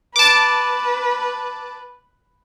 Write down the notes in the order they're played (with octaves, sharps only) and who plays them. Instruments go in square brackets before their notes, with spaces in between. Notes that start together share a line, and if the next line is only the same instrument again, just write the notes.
[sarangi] B4 [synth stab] A5 D6